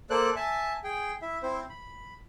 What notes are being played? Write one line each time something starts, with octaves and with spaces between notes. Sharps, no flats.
A#3 A4 C5 D5 F#6
E5 G#5 A5
G#4 G5
E4 E5
C4 E4 C5
B5